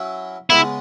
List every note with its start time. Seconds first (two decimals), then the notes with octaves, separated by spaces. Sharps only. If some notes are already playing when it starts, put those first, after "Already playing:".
Already playing: F#3 C#4 E4
0.50 C#3 G#3 B3 E4